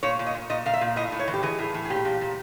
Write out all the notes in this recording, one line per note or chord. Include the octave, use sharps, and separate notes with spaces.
A#2 C#5
A#2
D#5
A#2
A#2 D#5
A#2 F5
E5
A#2
A2 D#5
A2
C#5
E3
G4
E3 G#4
A2
A2
G#4
A#2 G4
A#2
A#2